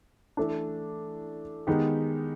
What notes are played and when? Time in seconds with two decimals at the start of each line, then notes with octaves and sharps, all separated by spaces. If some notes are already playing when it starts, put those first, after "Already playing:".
0.37 E3 A3 D4
1.67 D#3 G#3 B3 D#4 G4